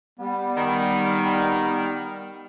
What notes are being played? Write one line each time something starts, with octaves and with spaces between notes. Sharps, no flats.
G3 B3
D#3